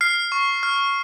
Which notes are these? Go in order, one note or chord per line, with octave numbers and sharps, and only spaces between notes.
F6 C7
C#6
F6